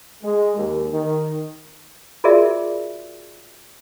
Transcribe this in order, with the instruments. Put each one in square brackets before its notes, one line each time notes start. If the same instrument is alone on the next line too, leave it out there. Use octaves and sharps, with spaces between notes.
[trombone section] G#3
D#2
D#3
[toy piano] F4 F#4 G#4 A#4 D5 E5